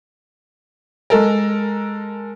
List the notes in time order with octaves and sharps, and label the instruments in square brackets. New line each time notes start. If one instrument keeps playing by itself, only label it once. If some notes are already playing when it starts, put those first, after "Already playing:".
[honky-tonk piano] G#3 A4 A#4